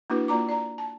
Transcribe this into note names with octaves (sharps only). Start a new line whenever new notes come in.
A#3 D4 E4 F#4 B4
A#3 F4 D5 A#5 D6
D5 A#5
A5